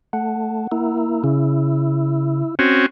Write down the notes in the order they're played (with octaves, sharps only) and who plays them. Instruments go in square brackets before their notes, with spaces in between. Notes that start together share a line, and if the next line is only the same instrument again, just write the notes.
[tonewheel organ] A3 [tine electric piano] F#5
[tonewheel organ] A#3 E4
[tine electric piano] C#3 [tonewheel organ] E4
[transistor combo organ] C4 C#4 F#4